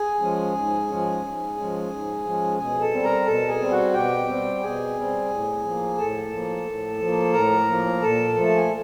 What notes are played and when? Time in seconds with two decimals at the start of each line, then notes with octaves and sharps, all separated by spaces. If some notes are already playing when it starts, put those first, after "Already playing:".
Already playing: G#4 G#5
0.20 F3 G#3 C#4
0.55 G#2
0.88 F3 G#3 C#4
1.22 G#2
1.56 F3 G#3 C#4
1.90 G#2
2.24 F3 G#3 C#4
2.58 B2 G#4 G#5
2.80 A4 A5
2.91 G3 C4
3.03 A#4 A#5
3.25 B2 A4 A5
3.48 G#4 G#5
3.60 G3 C4
3.71 F#4 F#5
3.93 B2 G4 G5
4.28 G3 C4
4.62 B2 G#4 G#5
4.96 G3 C4
5.30 A2
5.64 F3 A#3
5.98 A2 A4 A5
6.32 F3 A#3
6.66 A2
7.00 F3 A#3
7.33 A2 A#4 A#5
7.68 F3 A#3
8.01 A#2 A4 A5
8.35 F3
8.40 A3 A5
8.57 G#5